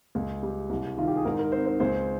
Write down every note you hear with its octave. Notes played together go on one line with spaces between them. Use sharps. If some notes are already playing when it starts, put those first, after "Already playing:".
C#2
G3
C2
D#3 F4
G4
G#4
G#2 A#4
A#4
C4 C5
C5
C#2 C5